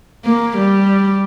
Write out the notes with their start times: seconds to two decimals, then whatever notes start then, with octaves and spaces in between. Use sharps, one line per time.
0.25 A#3
0.57 G3